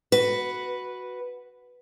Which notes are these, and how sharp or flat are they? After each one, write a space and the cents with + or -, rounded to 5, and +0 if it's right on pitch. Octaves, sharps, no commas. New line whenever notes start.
F#4 +0 B4 +0